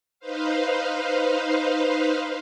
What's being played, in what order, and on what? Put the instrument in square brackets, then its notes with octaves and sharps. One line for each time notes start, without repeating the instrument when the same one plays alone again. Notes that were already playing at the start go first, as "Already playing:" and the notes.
[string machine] D#4 B4 C5 F5